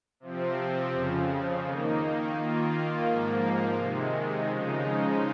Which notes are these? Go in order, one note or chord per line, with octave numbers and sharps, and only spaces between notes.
C3 F3 C4
F2 C#3 F3
D#3 A#3 D#4
D#3 A#3 F4
G#2 F3 A#3
C3 D#3 G#3
C#3 F3 G#3 D#4